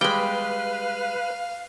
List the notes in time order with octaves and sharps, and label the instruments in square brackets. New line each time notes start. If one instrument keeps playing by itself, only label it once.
[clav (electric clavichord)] G3 G#3 [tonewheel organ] B4 [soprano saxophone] F5 [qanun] G5 B5